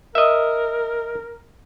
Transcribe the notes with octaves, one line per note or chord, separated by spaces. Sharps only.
A#4 D#5 E5